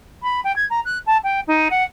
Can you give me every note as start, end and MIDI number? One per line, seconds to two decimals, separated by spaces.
0.22 0.40 83
0.44 0.54 79
0.56 0.65 92
0.70 0.80 82
0.85 0.98 90
1.06 1.17 81
1.23 1.40 79
1.47 1.68 63
1.70 1.83 78